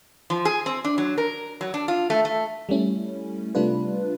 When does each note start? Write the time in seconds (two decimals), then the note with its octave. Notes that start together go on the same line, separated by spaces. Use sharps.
0.30 F3
0.45 G#4
0.66 C4
0.85 D4
0.98 F#3
1.18 A#4
1.61 F#3
1.74 D4
1.88 F4
2.10 A3
2.25 A3
2.69 G3 A3 C#4 E4
3.55 C3 G3 A3 D4 F4 B4